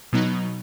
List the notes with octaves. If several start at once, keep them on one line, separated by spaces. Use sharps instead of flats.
B2 F#3 B3 D#4